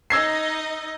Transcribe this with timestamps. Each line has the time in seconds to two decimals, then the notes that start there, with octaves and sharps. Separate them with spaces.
0.10 D#4 D#5 E6 G#6 C7